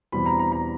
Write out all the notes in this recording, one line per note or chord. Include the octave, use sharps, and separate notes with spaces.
E2 B2 G3 C4 B5
A#5
A#5
A#5